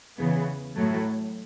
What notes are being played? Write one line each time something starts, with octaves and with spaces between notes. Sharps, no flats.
E2 C#3 E3 B3
A2 F#3 A3